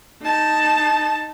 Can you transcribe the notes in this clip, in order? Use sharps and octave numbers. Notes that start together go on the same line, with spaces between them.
D#4 A5